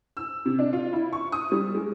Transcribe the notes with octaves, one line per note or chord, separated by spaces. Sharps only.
E6
C3
D4
F4
E4
C#6
D#6
G3
G#3